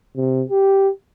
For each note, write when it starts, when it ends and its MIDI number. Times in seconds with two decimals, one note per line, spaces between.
0.17 0.43 48
0.50 0.89 67